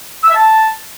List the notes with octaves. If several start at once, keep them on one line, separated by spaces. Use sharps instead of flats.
E6
E5
A5